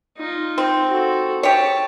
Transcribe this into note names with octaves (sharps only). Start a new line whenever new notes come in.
D#4 F4
C4
F#4 A4
G4 C#5 A5